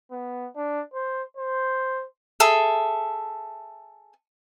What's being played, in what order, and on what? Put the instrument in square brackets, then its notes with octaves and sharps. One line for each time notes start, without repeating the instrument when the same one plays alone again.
[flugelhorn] B3
D4
C5
C5
[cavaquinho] G#4 A4 E5